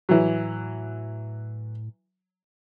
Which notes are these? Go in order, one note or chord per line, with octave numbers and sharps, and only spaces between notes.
A2 E3 F#3